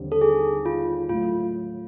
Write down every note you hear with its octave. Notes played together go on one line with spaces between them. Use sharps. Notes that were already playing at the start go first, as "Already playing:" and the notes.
Already playing: D#2 D3 G3 C4
A4
G#4
F4
A2 F#3 A3 F4